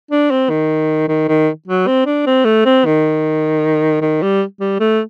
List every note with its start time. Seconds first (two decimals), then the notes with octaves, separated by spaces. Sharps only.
0.11 D4
0.31 C4
0.50 D#3
1.08 D#3
1.28 D#3
1.68 F#3
1.87 C4
2.06 D4
2.27 C4
2.45 A3
2.65 C4
2.85 D#3
4.01 D#3
4.22 G3
4.60 G3
4.80 A3